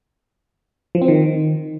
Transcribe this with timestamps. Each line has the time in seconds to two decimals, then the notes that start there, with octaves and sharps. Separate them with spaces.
0.95 F3
1.02 C4
1.08 D#3